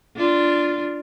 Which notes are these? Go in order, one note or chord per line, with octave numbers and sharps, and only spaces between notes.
D4 F4